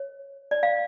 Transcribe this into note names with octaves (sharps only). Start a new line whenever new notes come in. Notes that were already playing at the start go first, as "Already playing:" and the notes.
Already playing: C#5
D5
F5